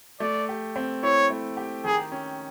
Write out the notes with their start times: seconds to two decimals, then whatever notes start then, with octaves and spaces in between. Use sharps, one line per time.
0.20 A3 D5
0.49 G4
0.76 C4
1.03 E4 C#5
1.30 A3
1.57 G4
1.84 D#3 G#4
2.12 C#4